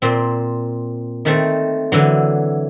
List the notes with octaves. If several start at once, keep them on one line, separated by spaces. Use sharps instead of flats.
A#2 C4
D#3 A3 C4
D3 E3 F#3